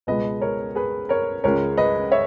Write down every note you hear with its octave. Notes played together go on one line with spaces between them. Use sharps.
C#2 B2 G#3 B4 D#5
A#4 C#5
G#4 B4
A#4 C#5
C#2 C#3 G#3 A#4 C#5
B4 D#5
C#5 E5